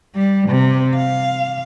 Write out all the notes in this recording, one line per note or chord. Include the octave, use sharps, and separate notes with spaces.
G3
C3
F5